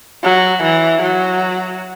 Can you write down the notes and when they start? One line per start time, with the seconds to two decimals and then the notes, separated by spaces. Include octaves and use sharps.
0.24 F#3
0.63 E3
1.02 F#3